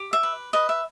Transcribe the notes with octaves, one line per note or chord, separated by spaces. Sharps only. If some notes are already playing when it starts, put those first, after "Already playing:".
Already playing: G4
E5
B4
B4 D#5
E5